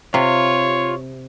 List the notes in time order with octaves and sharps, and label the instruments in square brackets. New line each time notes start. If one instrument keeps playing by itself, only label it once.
[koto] C3 [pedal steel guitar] F4 [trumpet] C#5